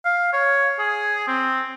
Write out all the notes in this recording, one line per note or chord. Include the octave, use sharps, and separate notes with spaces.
F5
C#5
G#4
C4